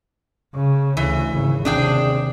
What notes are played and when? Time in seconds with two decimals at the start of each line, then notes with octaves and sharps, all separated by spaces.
0.54 C#3
0.97 D2 E3
1.32 G#1 C#3
1.65 D#2 C3 D4 G#4 G5